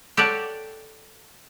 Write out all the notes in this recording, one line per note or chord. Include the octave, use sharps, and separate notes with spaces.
G4 A4 C#5 D5 F#5